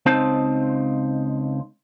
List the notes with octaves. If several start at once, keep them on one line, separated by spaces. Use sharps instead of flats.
C#2 C4 D#4 C5 A5